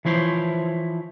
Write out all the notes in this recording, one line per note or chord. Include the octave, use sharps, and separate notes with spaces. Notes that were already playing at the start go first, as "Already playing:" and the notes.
E3 F3 E4 C5 C#5